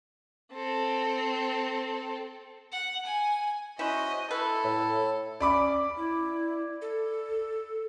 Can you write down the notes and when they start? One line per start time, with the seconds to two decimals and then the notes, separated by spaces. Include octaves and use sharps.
0.53 C4 A4
2.72 F#5
3.06 G#5
3.79 C#4 E4 F#4 C5 D#5
4.31 E4 A4 B4
4.64 A2
5.40 C#4 D5 B5 D6
5.97 E4
6.82 A4